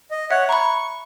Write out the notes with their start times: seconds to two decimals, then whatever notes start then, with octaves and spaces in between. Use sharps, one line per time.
0.11 D#5
0.31 C#5 E5 F#5
0.49 A#5 B5 C#6